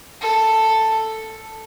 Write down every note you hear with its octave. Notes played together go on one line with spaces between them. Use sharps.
A4